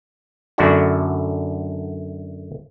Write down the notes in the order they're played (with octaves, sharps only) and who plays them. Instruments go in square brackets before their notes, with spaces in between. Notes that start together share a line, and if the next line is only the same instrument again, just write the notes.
[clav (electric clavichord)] F#2 D3 A3 D4 E4 F#4